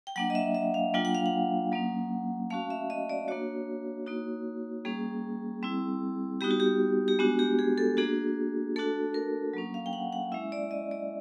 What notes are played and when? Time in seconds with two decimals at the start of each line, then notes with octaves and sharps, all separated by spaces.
0.07 G5
0.16 F#3 A#3 D4 F#5
0.30 D#5
0.35 E5
0.55 E5
0.74 F5
0.94 F#3 A#3 D4 F4 G5
1.05 F#5
1.15 F5
1.26 F#5
1.72 F#3 A#3 C#4
2.50 A3 C#4 F#4 F5
2.70 E5
2.90 D#5
3.09 D5
3.28 A#3 D4 F#4 C#5
4.06 A#3 D#4 F#4
4.85 G3 A#3 C#4 G#4
5.63 G3 C4 E4
6.41 G3 B3 D#4 F#4 G4
6.51 F#4
6.60 G4
7.08 G4
7.19 G#3 B3 D4 F#4
7.39 G4
7.59 G#4
7.78 A4
7.97 A#3 D4 F#4 G#4
8.76 A3 D4 F#4 A4
9.14 A#4
9.53 F#3 A#3 C#4
9.74 F5
9.86 G5
9.93 F#5
10.13 F#5
10.32 G#3 C#4 E4 E5
10.52 D5
10.71 D#5
10.91 D5